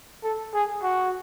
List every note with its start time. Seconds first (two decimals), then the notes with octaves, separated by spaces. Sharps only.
0.24 A4
0.54 G#4
0.83 F#4